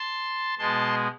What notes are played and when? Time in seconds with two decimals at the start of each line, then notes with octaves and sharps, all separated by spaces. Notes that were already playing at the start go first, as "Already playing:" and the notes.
Already playing: A5 C6
0.58 B2 G#3 A5 C6